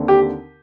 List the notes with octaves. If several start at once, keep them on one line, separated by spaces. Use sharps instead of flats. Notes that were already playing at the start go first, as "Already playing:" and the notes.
Already playing: D#2 D3 C4
G4